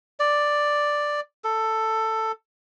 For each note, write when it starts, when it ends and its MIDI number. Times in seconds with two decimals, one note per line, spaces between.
0.20 1.20 74
1.44 2.32 69